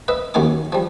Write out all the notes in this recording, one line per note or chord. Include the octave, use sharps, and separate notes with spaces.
B4 D#5 E5
D#2 F#3 A#3 D#4 G#5 D6
F3 G3